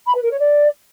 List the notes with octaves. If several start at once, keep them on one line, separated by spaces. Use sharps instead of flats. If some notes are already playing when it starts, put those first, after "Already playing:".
B5
B4
A#4
C#5
D5